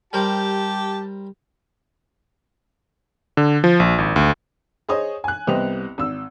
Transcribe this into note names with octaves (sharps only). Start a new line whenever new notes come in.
G3 G4 A#4 C5 A5
D3
F3
A#1
G#1
D2
G#4 C5 C#5 D#5 D#6
G#5 F#6
C2 B3 G4 C5 D#5 F7
G#1 E6